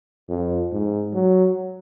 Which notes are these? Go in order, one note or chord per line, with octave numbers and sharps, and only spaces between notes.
F2
G#2
F#3